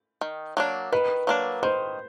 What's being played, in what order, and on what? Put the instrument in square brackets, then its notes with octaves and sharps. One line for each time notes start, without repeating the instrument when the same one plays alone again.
[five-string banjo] D#3
F#3 A#3 D4
[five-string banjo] D#3 [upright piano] B4
[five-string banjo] F#3 A#3 D4
[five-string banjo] D#3 [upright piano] C5